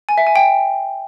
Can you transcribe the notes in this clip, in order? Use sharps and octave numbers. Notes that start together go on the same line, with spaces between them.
G#5
E5
G#5
G5